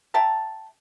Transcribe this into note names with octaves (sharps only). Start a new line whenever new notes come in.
E5 G5 A5 A#5